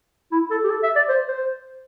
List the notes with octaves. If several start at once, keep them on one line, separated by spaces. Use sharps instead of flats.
E4
A4
G4
A4
E5
D5
C5
C5